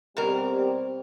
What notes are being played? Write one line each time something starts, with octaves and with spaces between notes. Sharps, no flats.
B2 G3 C4 G4 A#4